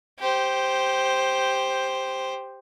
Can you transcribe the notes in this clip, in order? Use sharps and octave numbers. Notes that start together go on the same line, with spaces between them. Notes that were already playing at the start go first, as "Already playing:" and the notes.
G4 C5